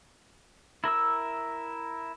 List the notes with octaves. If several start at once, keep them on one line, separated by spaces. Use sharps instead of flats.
E4 A#4 E5 E6